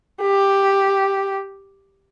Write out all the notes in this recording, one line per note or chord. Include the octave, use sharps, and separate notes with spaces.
G4